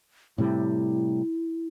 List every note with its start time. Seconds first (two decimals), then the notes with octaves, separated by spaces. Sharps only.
0.38 A2 C3 G3 E4